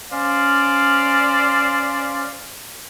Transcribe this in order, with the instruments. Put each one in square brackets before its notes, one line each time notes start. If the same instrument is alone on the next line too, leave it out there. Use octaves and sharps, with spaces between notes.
[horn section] C#4 C5 D5 F5